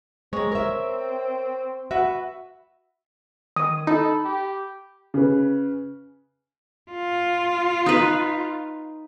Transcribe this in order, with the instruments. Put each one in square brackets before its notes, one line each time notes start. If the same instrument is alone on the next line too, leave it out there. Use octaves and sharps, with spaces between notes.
[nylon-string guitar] G#3 [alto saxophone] C4 [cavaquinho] C#5 A#5
[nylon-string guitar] A#4 E5
[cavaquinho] F#4 B4 [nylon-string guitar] E5
[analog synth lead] D#3 [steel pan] D#6
[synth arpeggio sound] D#4 [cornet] A4 [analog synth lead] B5
[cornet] G4
[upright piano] C#3 B4
[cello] F4
[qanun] D#4 B4